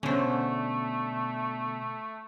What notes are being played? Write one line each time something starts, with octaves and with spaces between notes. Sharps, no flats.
B2 D3 A3 C#4 C5